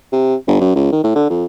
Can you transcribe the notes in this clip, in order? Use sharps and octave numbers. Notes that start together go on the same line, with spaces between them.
C3
G1
F#2
C#2
D#3
A2
D3
F2